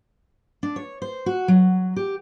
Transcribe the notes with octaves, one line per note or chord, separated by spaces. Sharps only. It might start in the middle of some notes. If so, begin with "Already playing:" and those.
D4
C#5
C5
F#4
F#3
G4